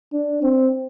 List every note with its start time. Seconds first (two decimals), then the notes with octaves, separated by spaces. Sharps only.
0.13 D4
0.43 C4